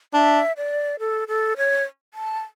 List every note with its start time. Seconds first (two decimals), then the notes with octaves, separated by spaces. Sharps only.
0.14 D4 E5
0.57 D5
1.00 A4
1.28 A4
1.57 C#5
2.14 A5